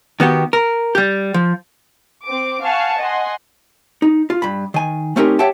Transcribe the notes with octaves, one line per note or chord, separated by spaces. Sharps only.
D#3 B3 F#4 G4
A#4
G3 G4
F3
C4 D6
F5 F#5 G#5 A5 C#6
D#5 F#5 G#5 C6
D#4
F4
G2 B5
D#3 G#5
A3 C4 C#4 D#4 G4 A#4
G4 C#5 E5 F#5 G5 A5